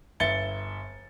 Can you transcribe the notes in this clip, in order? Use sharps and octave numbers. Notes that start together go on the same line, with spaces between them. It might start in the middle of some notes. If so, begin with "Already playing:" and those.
G1 E5 A6 C#7 G7